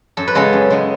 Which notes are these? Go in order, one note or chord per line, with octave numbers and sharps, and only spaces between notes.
F#2 A4
B4
C#3 G#3 B3 A4
F#2
C#3 G#3 B3